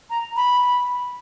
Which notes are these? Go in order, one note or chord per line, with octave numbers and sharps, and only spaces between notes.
A#5
B5